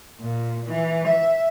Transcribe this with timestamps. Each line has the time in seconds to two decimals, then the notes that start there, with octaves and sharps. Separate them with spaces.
0.21 A#2
0.66 E3
1.07 E5